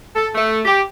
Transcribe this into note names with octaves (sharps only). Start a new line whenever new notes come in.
A4
A3
G4